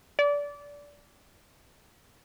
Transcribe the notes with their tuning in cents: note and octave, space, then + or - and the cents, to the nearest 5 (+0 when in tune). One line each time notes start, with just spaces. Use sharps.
D5 -25